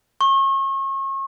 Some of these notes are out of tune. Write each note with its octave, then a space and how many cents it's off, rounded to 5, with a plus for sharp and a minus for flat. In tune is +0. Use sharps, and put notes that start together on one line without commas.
C#6 -35